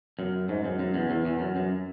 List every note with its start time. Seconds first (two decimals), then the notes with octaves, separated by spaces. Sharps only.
0.19 F#2
0.49 G#2
0.65 F#2
0.79 F#2
0.94 E2
1.10 E2
1.25 E2
1.40 F#2
1.56 F#2